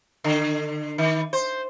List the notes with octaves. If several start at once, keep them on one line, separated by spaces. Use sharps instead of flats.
D3
D#3
C5